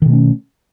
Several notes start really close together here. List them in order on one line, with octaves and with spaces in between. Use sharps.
D#3 B2 A3 C#4